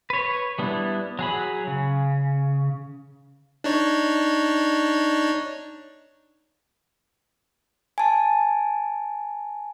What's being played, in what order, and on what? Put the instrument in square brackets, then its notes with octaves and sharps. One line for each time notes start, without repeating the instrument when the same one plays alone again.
[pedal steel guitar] B4 C#5
G3 B3 D4 E4
F#3 G#4 B5
C#3
[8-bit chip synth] D4 D#4 C#5
[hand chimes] G#5 A5